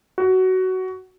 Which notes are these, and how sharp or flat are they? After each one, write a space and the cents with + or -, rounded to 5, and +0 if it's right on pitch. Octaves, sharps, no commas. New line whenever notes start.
F#4 +15